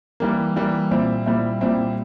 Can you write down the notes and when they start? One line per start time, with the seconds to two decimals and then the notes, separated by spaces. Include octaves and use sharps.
0.20 E3 G3 A#3
0.56 E3 G3 A#3
0.91 A#2 G3 C4 E4
1.26 A#2 G3 C4 E4
1.61 A#2 G3 C4 E4